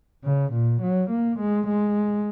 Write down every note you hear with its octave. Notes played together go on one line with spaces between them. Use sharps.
C#3
A#2
F#3
A#3
G#3
G#3